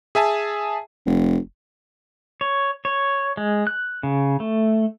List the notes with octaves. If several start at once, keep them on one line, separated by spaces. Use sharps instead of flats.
G#4 E5 G#5 A5
F1
C#5
C#5
G#3
F#6
C#3
A3